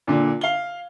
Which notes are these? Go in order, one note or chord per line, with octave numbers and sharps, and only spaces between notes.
A#2 D3
F5 G7